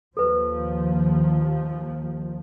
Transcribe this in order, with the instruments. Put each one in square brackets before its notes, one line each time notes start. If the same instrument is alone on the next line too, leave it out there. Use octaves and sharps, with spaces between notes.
[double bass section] D#2 F3 [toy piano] A4 B4